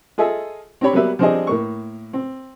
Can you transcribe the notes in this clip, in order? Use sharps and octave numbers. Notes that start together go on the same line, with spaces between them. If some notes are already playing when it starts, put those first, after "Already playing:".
F4 G#4 A4 D#5 E5
C4 D4 G4 C#5 B5
F#3 G3 A#3 B3 B4 E5
F3 G3 C4 D4 G#4 D#5
A2 A#3 C#6
C4